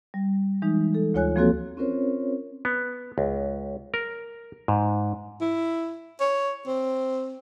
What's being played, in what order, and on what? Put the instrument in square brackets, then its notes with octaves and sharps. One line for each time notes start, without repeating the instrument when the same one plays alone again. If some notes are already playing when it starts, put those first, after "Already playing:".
[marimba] G3
E3 G#3 D#4
A4
D2 F4 C#5 G#5 F#6
F3 A#3 C4 F#4 A4 C#5
[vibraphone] C4 C#4 F4 A#4 C5 C#5
[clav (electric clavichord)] B3
C#2
A#4
G#2
[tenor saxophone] E4
C#5
C4